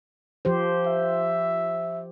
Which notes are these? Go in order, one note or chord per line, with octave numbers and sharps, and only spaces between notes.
F3 G4 C5
E5